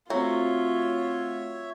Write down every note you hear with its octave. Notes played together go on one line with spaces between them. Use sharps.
F#3 A3 C4 F4 C#5 E5